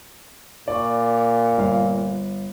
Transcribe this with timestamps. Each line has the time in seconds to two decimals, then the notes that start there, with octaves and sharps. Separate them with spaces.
0.68 A#2 D5 C#6
1.58 G1 F5